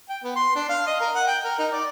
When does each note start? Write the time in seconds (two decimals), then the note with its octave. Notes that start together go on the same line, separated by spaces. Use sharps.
0.09 G5
0.23 B3
0.36 C6
0.55 D4
0.69 F5
0.87 D#5
1.00 A#4
1.14 F#5
1.27 G5
1.43 A#4
1.58 D#4
1.72 D5